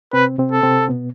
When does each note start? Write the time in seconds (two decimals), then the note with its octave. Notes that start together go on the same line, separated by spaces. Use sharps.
0.13 C3 C4 B4
0.38 C3 C4
0.52 A4
0.63 C3 C4
0.89 B2 B3